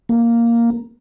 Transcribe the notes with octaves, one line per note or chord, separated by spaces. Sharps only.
A#3